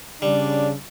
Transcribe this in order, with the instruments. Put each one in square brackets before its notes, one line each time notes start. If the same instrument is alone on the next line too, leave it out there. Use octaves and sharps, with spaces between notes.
[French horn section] C#3 [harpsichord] G3 [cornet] D4